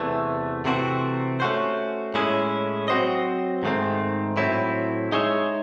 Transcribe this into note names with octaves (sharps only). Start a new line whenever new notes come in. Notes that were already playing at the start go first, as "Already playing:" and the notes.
Already playing: E2 C3 E3 A3
C3 E3 A3 C4 F#4
A3 C#4 F#4 C5
A2 G#3 C#4 E4 G#4
F#3 C4 F#4 C5 D#5
G#2 D#3 A3 C4
A2 F#3 C4 E4
G#3 D#4 G#4 C#5 E5